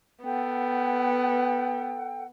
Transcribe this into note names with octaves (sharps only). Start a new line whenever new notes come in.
B3 A4 F#5 G5